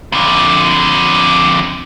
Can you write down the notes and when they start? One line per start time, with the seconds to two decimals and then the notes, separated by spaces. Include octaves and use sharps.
0.12 F2 D3